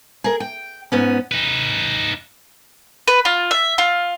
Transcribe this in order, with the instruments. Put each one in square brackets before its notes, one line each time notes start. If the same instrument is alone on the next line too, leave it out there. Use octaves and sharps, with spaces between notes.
[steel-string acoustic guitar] G#4 A#4
G5
G#2 B3 C#4
[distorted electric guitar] D#4 B4
[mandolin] B4
F4
E5
F4